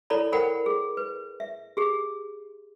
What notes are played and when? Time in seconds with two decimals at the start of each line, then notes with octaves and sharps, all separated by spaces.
0.10 E4 A4 C#5 D5 A#5 B5
0.32 A4 A#4 C5 F#5 G5 B5
0.66 G#4
0.97 B4
1.40 E5
1.77 G4 G#4